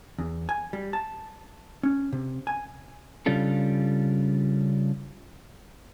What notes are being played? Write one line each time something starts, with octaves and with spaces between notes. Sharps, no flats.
E2
G#5
G3
A5
C#4
C3
G#5
C#3 G3 C#4 D4 F4 A4